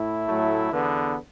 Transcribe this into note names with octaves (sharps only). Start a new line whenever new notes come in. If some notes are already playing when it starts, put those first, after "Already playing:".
Already playing: A2 E4
A2 F#3 A3
E2 D3 B3